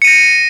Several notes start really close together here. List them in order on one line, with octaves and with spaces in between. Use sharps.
C#7 D#7 A#6